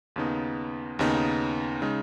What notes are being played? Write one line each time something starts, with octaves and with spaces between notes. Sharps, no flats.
D#2 C#3 B3 D#4
D#2 C#3 B3 D#4
C#3 G#3 D#4